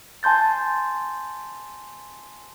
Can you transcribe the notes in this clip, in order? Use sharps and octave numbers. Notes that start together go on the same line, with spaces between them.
G#5 A5 C6 G6 A6